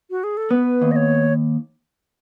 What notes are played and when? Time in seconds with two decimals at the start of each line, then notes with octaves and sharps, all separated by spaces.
0.10 F#4
0.24 G#4
0.37 A4
0.51 B3 B4
0.82 D#2
0.91 D#5
0.96 C#5